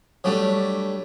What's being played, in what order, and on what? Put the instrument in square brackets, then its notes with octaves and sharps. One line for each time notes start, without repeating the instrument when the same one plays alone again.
[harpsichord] F#3 G3 A3 D4